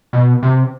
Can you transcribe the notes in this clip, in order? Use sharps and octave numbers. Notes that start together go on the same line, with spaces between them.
B2
C3